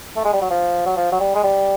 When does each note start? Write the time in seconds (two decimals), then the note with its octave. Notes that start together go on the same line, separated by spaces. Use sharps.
0.16 A3
0.25 G#3
0.33 G3
0.41 F#3
0.50 F3
0.86 F#3
0.97 F3
1.12 F#3
1.20 G3
1.35 G#3
1.44 G3